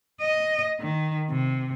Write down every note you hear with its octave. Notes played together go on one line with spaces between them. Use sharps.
D#5
D#3
C3